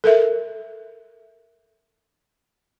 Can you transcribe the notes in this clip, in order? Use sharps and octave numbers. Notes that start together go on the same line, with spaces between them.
A4 A#4 E5